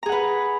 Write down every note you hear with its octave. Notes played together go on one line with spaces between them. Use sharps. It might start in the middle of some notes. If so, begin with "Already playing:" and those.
G#4 B4 F#5 A#5